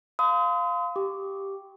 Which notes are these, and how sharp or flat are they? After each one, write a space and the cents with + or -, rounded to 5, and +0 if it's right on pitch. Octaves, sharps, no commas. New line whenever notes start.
F5 +0 C6 -40 D#6 +30
G4 +0 D6 +0